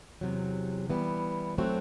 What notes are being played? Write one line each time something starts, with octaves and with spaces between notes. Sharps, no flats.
E2 C3 F#3
E3 G3 B3
F#3 A3 C4 F#4